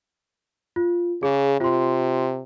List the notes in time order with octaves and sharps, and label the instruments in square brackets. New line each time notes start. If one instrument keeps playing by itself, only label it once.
[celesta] F4
[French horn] C#3 [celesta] G#4
[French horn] C3 [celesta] F4 C6